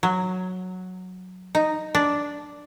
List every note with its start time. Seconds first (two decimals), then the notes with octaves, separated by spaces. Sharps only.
0.03 F#3
1.55 D#4
1.95 D4